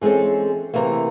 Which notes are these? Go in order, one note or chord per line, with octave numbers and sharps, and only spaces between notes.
E3 G#3 C4 C#4 A4
C3 E3 A3 A#3